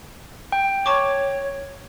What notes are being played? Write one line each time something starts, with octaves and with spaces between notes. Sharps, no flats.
G5
C#5 A5 C#6 D6